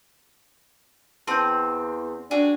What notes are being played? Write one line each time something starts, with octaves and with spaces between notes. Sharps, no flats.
E2 C4 A5 D#6 G6
D4 F#4 G#4